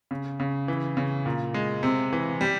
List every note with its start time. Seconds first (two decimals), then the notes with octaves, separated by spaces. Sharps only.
0.11 C#3
0.40 C#3
0.68 E3
0.97 C#3
1.26 A#2
1.54 G#3
1.83 C3
2.13 E3
2.41 G3